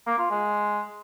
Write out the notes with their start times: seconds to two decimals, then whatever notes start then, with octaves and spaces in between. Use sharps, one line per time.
0.06 A#3
0.18 F4
0.30 G#3